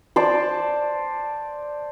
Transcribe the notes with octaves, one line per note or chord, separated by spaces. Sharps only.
C5 D5 A5